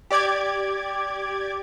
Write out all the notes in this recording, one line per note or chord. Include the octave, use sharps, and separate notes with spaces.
G4 D5 D6 G#6